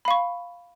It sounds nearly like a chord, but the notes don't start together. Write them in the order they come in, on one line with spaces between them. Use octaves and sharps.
B5 F5 C#6